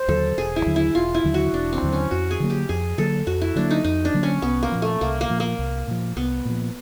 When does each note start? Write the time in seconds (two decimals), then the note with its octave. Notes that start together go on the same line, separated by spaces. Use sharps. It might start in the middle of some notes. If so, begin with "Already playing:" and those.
Already playing: C5
0.08 D#2 D3 F#3 A4
0.37 E1 G#4
0.56 E4
0.66 D#2 D3 F#3
0.76 E4
0.95 E1 F4
1.14 E4
1.24 D#2 D3 F#3
1.34 F#4
1.53 E1 D4
1.73 C4
1.82 D#2 D3 F#3
1.92 C#4
2.11 F2 F#4
2.31 G#4
2.40 D3 F#3 A#3
2.50 G4
2.69 F2 G#4
2.98 D3 F#3 A#3 A4
3.27 F2 F#4
3.42 E4
3.56 D3 F#3 A#3 D4
3.71 D#4
3.84 F2 D#4
4.05 D4
4.14 D3 F#3 A#3
4.23 C#4
4.42 C2 B3
4.63 A#3
4.72 A#2 F3
4.82 A3
5.01 C2 A#3
5.21 A#3
5.30 A#2 F3
5.40 A#3
5.59 C2
5.88 A#2 F3
6.16 C2 B3
6.45 A#2 F3